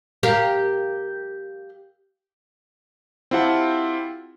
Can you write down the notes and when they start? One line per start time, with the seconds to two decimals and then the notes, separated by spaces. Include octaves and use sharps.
0.23 G4 A#4 F5
3.31 C4 E4 F4 G4 F#5 A5